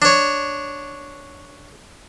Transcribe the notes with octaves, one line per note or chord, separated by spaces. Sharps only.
D4 C#5